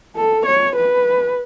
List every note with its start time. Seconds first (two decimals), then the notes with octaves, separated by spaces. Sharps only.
0.16 A4
0.46 C#5
0.76 B4